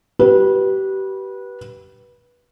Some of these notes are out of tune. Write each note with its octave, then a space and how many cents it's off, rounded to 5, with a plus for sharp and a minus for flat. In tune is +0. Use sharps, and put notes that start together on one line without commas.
G4 -30 B4 -20